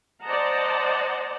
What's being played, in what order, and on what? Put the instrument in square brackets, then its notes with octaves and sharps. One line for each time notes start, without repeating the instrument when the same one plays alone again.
[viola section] C5 D5 D#5 F#5 A5 A#5